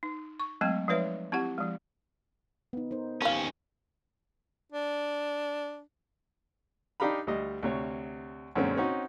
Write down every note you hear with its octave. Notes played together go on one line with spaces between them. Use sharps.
D#4
C#6
F#3 G#3 A3 C4 G5
F3 G#3 D#4 B4 C#5 E5
C4 E4 G4 F#5
F3 G#3
B3 D#4
D#4 A#4 C5
D#2 G3 C#4 F5
D4
D4 D#4 G4 F5 A#5 B5
D2 G3 D#5
D2 C3 C#5
F#2 A#2 D3 G#3 C4 C#4
C4 C#4 D#4 F#4